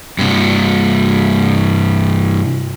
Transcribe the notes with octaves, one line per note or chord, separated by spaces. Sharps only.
G2 C3